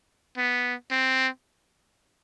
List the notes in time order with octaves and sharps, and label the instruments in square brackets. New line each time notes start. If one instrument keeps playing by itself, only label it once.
[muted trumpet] B3
C4